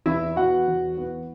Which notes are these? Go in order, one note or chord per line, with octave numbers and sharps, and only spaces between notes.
E2 E4 E5
E3 B3 F#4 F#5
E2
E3 B3